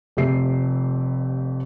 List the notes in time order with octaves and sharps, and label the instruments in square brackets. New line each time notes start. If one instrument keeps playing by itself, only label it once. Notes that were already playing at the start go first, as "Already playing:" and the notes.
[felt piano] F1 F2 A3 G4 E5 C7